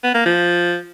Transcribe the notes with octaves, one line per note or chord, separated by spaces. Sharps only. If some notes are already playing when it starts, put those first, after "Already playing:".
B3
A#3
F3